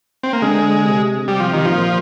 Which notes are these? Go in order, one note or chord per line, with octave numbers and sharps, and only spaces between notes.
C4
A#3
D3 G#3
C3
C3 G3
F3
D#3
F3
A#2